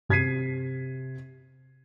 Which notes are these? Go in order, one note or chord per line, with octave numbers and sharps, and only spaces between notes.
C3 G#6 B6 C7 D#7